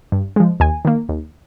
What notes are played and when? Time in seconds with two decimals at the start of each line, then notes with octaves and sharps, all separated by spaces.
0.12 G2
0.36 F3 G#3
0.60 D#2 G#5
0.85 D#3 A#3
1.09 D#2